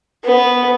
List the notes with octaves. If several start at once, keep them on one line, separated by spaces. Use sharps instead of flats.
B3